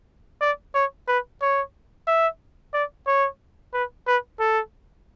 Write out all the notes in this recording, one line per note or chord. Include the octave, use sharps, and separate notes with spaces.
D5
C#5
B4
C#5
E5
D5
C#5
B4
B4
A4